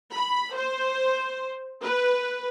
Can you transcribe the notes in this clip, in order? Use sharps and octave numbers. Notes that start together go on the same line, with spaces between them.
B5
C5
B4